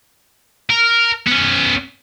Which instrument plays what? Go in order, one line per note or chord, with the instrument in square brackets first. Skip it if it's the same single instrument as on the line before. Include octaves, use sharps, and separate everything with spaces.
[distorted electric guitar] A#4
B3 C#4